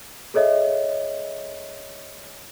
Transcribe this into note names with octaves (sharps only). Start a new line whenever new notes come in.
G#4 A4 C#5 D#5 E5